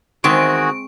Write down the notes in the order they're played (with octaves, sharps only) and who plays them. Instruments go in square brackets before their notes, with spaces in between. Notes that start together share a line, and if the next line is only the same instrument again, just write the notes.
[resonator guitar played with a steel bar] E2 D#3 [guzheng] G#3 C4 [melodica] F#4 G#4 [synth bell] C#6 D7